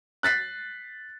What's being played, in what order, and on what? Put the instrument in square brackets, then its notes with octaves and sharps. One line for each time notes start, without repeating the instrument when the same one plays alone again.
[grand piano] F#6 A6 B6 C7